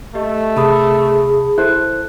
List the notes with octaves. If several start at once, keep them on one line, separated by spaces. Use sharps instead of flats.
A3 G4 D#5
C3 G#4 A5 B5 D#6
E4 A4 C5 F#6